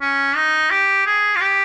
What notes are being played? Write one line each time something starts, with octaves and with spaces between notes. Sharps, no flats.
C#4
D#4
G4
G#4
F4
G4